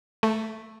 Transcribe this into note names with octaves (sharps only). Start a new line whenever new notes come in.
A3